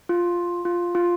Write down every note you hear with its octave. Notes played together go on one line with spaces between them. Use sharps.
F4
F4
F4